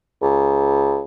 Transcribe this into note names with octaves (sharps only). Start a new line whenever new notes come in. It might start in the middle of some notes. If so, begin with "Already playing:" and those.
C#2